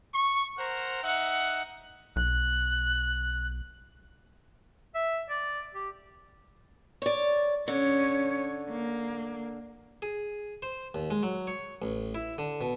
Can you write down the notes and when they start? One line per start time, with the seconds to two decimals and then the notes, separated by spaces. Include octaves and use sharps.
0.13 C#6
0.58 A#4 C5 F#5 A#5
1.03 D#4 E5 F#5
2.16 B1 F#6
4.95 E5
5.30 D5
5.75 G4
7.02 C#5 D5
7.68 D3 C#4 C#5
8.70 A#3
10.02 G#4
10.62 C5
10.94 D#2
11.11 G#3
11.23 F#3
11.47 C#5
11.82 A1
12.15 E4
12.38 D3
12.61 B2